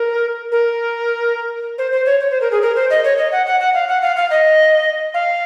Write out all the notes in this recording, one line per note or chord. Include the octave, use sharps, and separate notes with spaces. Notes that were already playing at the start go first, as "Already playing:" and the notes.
Already playing: A#4
A#4
C5
C5
C#5
C#5
C5
A#4
G#4
A#4
C5
D#5
C#5
D#5
F#5
F#5
F#5
F5
F#5
F5
F5
D#5
F5